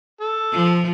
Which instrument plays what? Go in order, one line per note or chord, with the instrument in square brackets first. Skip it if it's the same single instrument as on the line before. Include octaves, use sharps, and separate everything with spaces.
[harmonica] A4
[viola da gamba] F3